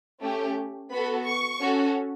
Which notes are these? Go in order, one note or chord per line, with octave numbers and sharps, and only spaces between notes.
A3 C#4 G4
B3 F#4 A4 B5
C#6
C#4 F#4 A4